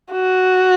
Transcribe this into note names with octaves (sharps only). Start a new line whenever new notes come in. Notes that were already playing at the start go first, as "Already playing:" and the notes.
F#4